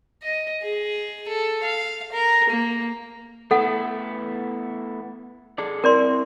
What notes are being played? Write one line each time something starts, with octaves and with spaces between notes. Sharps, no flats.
D#5
G#4
A4
F5
A#4
A#3
A3 B3 E4 A4 F#5
G#4 A4 D5
C4 E4 A#4 D5 C6